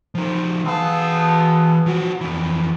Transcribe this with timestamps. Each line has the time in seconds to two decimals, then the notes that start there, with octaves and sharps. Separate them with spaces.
0.15 F3 D#4
0.65 E3 B3 G#4 A4 F5
1.86 F3 F#4
2.21 F2 E3